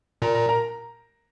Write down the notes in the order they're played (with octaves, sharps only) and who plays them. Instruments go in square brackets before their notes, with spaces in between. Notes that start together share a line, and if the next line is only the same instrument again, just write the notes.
[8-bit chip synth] A#2 [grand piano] A#4 A#5
[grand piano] A#4 A#5
A#4 A#5